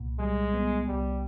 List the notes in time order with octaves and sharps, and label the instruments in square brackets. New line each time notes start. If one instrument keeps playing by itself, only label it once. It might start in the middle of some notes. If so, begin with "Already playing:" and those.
Already playing: [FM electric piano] C2 A#2
[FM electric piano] G3 [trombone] G#3
[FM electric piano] B3
[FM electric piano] C2 [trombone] G3